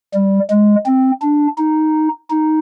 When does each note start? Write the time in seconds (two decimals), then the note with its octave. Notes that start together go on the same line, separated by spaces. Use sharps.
0.14 G3
0.51 G#3
0.86 C4
1.22 D4
1.58 D#4
2.30 D#4